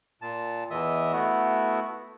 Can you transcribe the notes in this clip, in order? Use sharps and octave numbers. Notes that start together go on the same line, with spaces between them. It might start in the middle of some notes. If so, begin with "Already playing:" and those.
A#2 A5
E2 E3 D#5 E5 D#6
A3 B3 E4 F#4